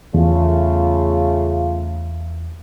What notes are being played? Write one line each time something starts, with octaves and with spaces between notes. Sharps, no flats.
E2 C#3 A3 F4